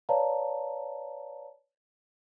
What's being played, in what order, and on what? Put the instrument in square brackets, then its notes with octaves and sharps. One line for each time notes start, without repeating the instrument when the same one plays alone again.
[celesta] B4 C#5 D5 F5 A5 A#5